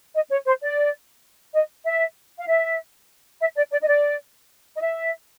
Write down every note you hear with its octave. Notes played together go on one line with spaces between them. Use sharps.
D#5
C#5
C5
D5
D#5
E5
F5
E5
E5
D5
D5
D#5
D5
D#5
E5